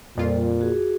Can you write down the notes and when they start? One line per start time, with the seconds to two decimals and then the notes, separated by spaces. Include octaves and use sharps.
0.17 F2 A#2 G3 F4 D5
0.61 F#4 G#4